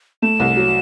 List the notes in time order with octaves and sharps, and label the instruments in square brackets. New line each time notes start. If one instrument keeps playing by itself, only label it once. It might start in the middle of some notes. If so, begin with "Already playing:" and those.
[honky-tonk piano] A3 [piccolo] E7
[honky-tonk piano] C2
F#3